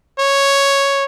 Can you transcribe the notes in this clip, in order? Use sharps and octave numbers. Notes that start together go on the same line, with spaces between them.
C#5